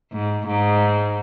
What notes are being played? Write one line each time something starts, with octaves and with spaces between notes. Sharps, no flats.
G#2
G#2